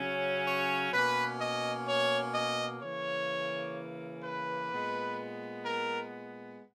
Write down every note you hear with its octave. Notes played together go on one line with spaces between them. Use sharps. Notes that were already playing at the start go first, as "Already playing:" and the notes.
Already playing: C#3 F#3 C#4
C#5
B2 A#3 C#4 B4
D#5
C#5
D#5
C#3 E3 A#3 C#5
B4
A#2 G#3 B3
A#4